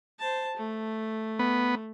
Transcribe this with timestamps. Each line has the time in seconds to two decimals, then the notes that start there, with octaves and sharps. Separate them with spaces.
0.19 C5 A5
0.57 A3
1.39 B3